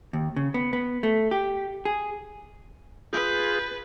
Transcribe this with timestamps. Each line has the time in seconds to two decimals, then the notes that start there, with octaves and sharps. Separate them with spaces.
0.13 D#2
0.36 C#3
0.54 B3
0.73 B3
1.03 A3
1.31 G4
1.85 G#4
3.13 F4 G#4 B4 G6